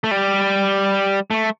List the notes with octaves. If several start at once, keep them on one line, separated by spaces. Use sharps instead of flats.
A3
G3
A3